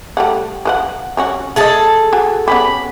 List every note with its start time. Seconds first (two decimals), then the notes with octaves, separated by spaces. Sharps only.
0.17 G3 A3 F#5
0.65 F3 B4 F#5
1.17 G3 C#4 F#4
1.56 A3 G#4 A4 D#5 A5
2.13 F#4 G#5
2.48 B3 C#4 G4 B5